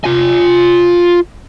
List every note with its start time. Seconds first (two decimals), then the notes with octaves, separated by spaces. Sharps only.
0.04 F4 G#5